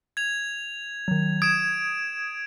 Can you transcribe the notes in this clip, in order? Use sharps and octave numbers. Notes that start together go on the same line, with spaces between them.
G#6 F7
D#3 F#3
D#6 G#6 D7 E7